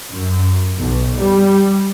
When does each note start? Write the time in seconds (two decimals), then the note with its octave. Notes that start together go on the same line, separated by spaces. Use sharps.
0.12 F#2
0.79 B1
1.17 G3